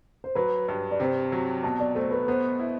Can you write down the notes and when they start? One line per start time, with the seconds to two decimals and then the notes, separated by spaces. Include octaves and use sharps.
0.24 C5
0.35 F#3 B4
0.68 G2 B4
0.91 D5
1.00 C3 C5
1.32 F#3
1.63 B2 A5
1.80 D5
1.95 A3 C5
2.11 B4
2.28 B3 C5
2.59 E4